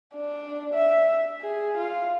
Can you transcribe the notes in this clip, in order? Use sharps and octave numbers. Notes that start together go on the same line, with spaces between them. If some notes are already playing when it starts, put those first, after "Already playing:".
D4
E5
G#4
F4